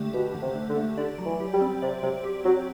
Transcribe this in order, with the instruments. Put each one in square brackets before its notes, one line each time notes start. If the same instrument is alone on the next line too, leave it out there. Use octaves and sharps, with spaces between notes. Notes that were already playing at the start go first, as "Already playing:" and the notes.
Already playing: [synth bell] D3 A3 D4 G4
[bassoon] B2 [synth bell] G4
[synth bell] D3
[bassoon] C3
[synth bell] D4
[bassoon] D3
[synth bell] A3
[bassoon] D3 [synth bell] D5
[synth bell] F#3
[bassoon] E3
[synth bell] G4
[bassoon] G3
[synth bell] C4
[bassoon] C3 [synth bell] D5
[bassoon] C3 [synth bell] F#3
[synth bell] G4
[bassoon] F#3 [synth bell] C4